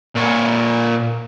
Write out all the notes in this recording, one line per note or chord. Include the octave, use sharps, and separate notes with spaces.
A#2 C#5